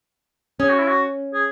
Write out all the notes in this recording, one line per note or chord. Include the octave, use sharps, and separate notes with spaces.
C#4 G#4
F#4
E4
F#4
G#4